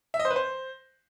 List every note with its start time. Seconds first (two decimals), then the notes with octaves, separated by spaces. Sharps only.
0.14 E5
0.19 D#5
0.25 C5
0.30 B4
0.36 C5